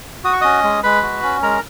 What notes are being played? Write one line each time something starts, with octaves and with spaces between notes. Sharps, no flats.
F#4 D#6
C#6
C#4 D#5 D#6
G#3
G#3 B4 B5
F#4
C#4
G#3 A#4 A#5